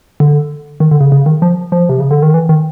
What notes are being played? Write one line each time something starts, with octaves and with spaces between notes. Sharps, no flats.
D3
D#3
D3
C#3
C#3
D#3
F3
F3
C3
C#3
D3
D#3
E3
D#3